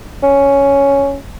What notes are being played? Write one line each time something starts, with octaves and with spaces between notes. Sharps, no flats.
C#4